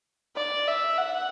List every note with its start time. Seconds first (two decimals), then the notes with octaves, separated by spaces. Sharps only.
0.36 D5
0.68 E5
0.98 F#5